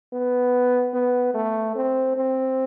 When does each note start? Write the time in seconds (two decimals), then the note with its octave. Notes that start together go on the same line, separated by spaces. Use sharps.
0.13 B3
0.94 B3
1.34 A3
1.76 C4
2.16 C4